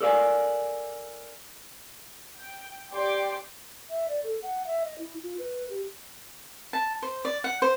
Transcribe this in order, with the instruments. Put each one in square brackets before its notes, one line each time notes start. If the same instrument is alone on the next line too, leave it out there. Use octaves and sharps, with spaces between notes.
[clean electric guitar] A4 A#4 D5 E5 F5 G#5
[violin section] G5
G4 D5 G5 C6 D6
[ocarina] E5
D5
A4
F#5
E5
D#5
E4
F4
B4
G4
[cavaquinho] A5
C5
D5
F#5
C5